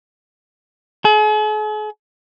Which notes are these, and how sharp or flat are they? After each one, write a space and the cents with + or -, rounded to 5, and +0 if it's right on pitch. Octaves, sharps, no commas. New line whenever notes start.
G#4 +45